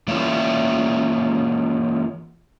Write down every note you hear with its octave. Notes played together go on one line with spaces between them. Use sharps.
E3 A#3 C#4 F4 E5